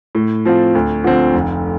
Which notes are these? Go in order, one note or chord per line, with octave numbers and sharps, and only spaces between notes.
A2
F3 C4 F4
D2
D3 F3 C4
F1